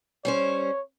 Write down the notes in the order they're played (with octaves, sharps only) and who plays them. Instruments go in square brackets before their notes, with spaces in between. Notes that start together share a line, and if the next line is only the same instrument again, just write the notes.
[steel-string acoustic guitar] G3 C#4 C5 [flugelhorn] C#5